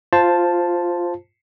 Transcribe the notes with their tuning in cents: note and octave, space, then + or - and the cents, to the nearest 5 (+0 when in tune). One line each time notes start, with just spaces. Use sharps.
F4 +0 C5 +0 A5 +0